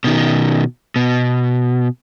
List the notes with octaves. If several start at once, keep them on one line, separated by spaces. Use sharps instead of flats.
B2 D#3
B2